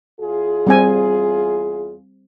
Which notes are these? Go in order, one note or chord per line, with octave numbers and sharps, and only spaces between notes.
E2 F4 G#4
G3 C4 G#5